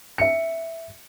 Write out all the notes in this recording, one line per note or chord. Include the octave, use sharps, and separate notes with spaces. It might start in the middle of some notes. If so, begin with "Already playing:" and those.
E5 C#7